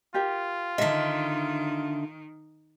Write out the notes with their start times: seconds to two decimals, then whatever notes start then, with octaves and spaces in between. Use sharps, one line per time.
0.14 F4 G4 A#4 G5
0.78 D3 D#3 D#5 E5 A5